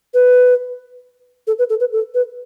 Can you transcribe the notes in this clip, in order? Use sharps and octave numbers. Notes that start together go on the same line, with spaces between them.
B4
A4
B4
A4
B4
A4
B4